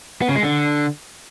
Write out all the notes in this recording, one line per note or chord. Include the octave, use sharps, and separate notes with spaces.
B3
C#3
G#3
D3